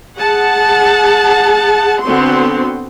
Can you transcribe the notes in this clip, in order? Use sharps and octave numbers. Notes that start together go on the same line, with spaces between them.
G#4 F#5 A5
D3 B3 C4 F#4 C6